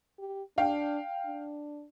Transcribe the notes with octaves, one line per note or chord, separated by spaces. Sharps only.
G4
D4 F5 G5
D4